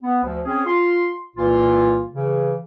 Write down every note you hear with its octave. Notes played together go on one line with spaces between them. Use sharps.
B3
D2 F3
C4 C#4 G#4
F4 C6
C2 A#2 E3 A#3 F4
C#3 E3